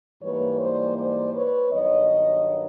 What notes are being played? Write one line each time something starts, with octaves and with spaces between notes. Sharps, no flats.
G#2 E3 G3 A#3 B4 C#5
C5 D5
C5 D5
B4 C#5
G2 D#3 F#3 B3 C#5 D#5